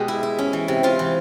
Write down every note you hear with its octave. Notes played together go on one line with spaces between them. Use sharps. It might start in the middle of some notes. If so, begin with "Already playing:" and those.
Already playing: B2 G#3 G4
E4
E4
C#4
E3
C3
C3 F4
E3